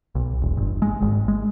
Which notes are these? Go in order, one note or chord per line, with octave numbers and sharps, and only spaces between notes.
B1
E1
G1
G#3
G#1
G#3